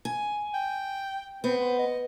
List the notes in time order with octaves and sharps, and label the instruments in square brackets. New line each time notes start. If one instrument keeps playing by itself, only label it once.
[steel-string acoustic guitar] G#5
[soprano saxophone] G5
[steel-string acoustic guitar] B3 [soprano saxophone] C4
[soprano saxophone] C5
D#5